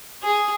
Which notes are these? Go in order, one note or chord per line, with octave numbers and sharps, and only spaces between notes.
G#4